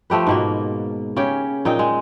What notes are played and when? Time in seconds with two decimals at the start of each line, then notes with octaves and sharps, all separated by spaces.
0.10 F3 A3 G4 B4
0.27 G#2 B2 A#3
1.16 C#3 C#4 G4 G5
1.65 A#2 D#4 G5
1.79 G#3